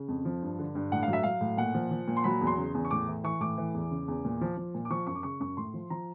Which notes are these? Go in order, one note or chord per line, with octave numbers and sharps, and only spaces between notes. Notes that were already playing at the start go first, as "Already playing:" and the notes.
Already playing: C#3
F2
F3
G2
D3
G2
A2 F#5
F5
F#3
E5
F#3 F5
A2
A#2 F#5
F3
F3
A#2
C6
F#3 B5
E2
C6
C#3
E2
C#6
A2 D6
E3
E3 C#6
A2 D6
E3
E2
C#3
E2
A#2
F3
F3
A#2
D6
F3 C#6
F#2 C#6
D6
C#3 C#6
F#2 C#6
A2 C6
F3
F3 A#5